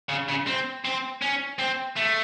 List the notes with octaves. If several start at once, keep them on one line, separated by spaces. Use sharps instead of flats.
C#3
C#3
C4
C4
C#4
C4
A3